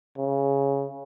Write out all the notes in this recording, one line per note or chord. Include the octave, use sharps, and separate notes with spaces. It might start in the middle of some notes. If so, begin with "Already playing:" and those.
C#3